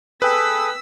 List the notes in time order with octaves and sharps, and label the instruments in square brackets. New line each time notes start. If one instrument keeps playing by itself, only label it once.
[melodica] G#4 A4 D#6 [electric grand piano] B4 G5 [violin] E6 B6